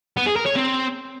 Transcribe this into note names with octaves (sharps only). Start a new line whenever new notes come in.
B3
G#4
A#4
C#5
C4